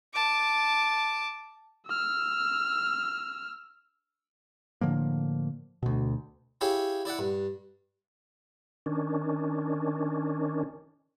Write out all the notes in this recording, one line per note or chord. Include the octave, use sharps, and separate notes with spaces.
A5 D6
E6 F6
A2 D3 F3 A#3
D2 B2
E4 G4 G#4 C#5 E5 F5
E4 D5 E5 F#5
G2
D#3 C#4 D4